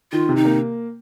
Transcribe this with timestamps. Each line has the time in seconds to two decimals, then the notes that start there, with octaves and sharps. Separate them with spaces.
0.12 D#3 F4
0.29 C3
0.36 D#4
0.45 A#3